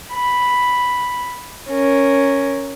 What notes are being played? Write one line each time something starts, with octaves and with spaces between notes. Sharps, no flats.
B5
C#4 A#4